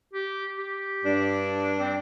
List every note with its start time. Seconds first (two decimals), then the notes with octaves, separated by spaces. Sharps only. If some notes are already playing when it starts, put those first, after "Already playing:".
0.14 G4
0.58 G4
1.05 G2 D4
1.80 C4